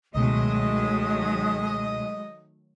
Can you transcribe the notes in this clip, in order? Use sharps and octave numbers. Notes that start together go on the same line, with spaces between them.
C#2 B2 D#3 F#3 G#3 A3 D#5